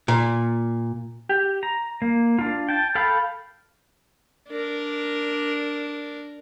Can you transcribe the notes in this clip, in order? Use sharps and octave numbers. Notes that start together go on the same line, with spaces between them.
A#2
G4
A#5
A#3
D4 F4
G5 A5
A4 F5 G5 B5
D4 A#4